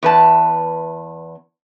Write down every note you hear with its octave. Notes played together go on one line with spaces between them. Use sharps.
E2 B4 A5